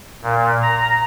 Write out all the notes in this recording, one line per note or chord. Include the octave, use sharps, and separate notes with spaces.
A#2
A#5